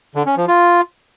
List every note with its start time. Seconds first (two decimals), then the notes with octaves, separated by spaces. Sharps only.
0.15 D3
0.26 C#4
0.37 F3
0.48 F4